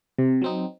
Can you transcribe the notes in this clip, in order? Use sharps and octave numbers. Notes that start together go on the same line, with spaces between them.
C3
F#3 C4 D#4